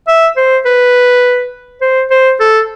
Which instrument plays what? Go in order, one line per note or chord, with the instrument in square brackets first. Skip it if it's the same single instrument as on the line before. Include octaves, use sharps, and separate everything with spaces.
[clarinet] E5
C5
B4
C5
C5
A4